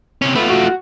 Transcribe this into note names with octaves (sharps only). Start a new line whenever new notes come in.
C3 C#4
A3 B3 F4
F#4